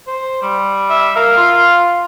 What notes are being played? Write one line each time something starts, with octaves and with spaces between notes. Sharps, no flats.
C5
G3
E5
A#4 F5
F4